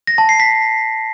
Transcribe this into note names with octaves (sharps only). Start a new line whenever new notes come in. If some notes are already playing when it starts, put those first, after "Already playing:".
A#6
A5
C7
B6